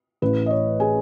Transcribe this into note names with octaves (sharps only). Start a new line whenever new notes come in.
A1 A2 E3 B4
D#5
C#5
G#4 G#5